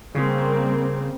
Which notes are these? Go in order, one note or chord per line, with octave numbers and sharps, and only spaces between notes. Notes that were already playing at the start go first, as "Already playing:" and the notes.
C#3 G3 A#3 C4